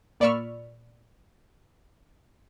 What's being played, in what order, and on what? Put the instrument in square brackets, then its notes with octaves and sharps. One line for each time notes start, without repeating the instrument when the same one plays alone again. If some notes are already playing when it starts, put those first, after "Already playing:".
[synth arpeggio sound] A#2 D5 B5 C#6 E6 F6